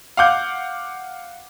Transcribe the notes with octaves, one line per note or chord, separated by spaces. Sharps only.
F5 F#5 D6 G6